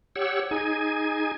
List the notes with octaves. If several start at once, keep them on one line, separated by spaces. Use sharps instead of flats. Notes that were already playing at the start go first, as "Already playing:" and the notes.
G4 C#5 F#5 E6
D#4 G#4 G#5